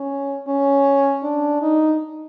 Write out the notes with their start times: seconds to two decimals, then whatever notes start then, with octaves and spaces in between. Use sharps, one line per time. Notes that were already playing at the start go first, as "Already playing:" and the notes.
Already playing: C#4
0.48 C#4
1.24 D4
1.62 D#4